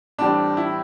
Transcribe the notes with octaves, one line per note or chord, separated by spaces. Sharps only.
A2 E3 G3 C4 D4
E4